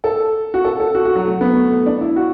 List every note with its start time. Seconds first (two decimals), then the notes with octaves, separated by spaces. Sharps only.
0.04 A4
0.54 F#4
0.64 A4
0.80 A4
0.95 F#4
1.05 F#4
1.16 F#3
1.26 A3
1.41 B3
1.56 A3
1.86 D4
2.01 E4
2.16 F#4